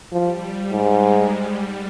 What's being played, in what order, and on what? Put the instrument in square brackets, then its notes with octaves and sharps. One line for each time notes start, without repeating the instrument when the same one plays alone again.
[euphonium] F3 [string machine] G3
[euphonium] G#2 [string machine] G#3
[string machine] G3